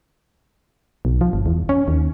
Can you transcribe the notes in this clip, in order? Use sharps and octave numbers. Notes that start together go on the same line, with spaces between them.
B1
F3
G1
E2
C#4
D#2